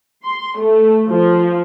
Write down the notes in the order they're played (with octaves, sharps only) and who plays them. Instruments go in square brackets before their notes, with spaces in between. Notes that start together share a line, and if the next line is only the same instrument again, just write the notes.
[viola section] C6
A3
F3